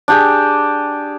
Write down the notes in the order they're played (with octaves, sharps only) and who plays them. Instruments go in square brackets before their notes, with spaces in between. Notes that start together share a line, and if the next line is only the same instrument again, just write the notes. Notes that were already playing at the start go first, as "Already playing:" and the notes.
[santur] D4 G4 G#4